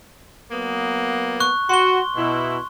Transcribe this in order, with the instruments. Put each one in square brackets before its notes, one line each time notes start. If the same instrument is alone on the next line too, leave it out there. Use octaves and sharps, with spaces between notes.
[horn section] F#3 A#3 B3
[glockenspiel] C#6 F#6
[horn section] F#4 [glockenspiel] C6 G7
[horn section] B2 E4